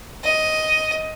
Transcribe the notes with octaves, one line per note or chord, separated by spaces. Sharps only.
D#5